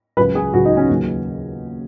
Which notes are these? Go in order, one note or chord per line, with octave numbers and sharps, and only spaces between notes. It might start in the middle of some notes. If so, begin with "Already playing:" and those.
C#2 C#3 F#3 B4
G#4
C#2 C#3 F#3 F#4
D#4
C#4
D#2 C#3 F#3